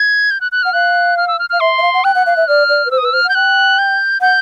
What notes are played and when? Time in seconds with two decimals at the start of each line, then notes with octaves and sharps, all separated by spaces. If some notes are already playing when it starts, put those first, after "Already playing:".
Already playing: G#6
0.31 G6
0.41 F#6
0.52 F#6
0.63 F#5 F6
0.73 F5 F#6
1.17 F6
1.28 E6
1.39 F6
1.50 F5 F6
1.60 E5 C6
1.78 E5
1.82 F5
1.94 F#5
2.04 G5 F#6
2.15 F#5
2.26 F5
2.37 E5
2.48 D5 F6
2.69 D5
2.86 B4
2.91 C5 E6
2.98 D#6
3.02 B4 E6
3.12 C5 F6
3.24 F#5
3.29 G6
3.35 G5 F#6
3.79 G6
4.21 F#5 G6